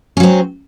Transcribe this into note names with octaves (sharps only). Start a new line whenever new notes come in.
F#3 C4 C#4